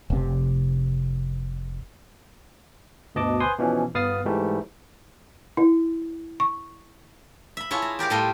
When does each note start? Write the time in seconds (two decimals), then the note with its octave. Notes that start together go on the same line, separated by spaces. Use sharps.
0.10 F1 C3
3.15 G1 D2 B2 D#5 A5 D6
3.40 B4 C5 G#5 C6 D#6
3.58 B2 E3 F3 C#4
3.94 G1 B3 F5 D#6 A6 C7
4.25 G#2 E3 G3 A3
5.57 E4
6.40 C#6
7.57 E5 B5
7.71 E4 F4 G#4 C#5 E5 A5
7.82 A#5
7.99 G4 A#4 D5 F5
8.10 A2 G3 F4 A4 D#5 C6